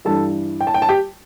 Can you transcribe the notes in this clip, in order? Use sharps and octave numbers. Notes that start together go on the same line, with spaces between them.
G2 E3 G3 A4 A5
G5
A5
G5
A5
G4 G5